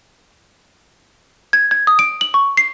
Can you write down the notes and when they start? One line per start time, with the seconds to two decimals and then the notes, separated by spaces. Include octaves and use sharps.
1.53 G#6
1.71 G#6
1.87 D#6
1.99 D7
2.21 F#7
2.34 C#6
2.57 C7